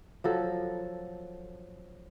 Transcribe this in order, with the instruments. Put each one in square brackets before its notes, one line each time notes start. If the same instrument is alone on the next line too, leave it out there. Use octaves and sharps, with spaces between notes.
[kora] F3 F#3 A4